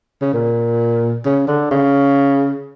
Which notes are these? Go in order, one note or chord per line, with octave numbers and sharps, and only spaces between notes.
C#3
A#2
C#3
D3
C#3